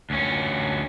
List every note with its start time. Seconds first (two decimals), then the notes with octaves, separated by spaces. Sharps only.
0.10 D2 C#4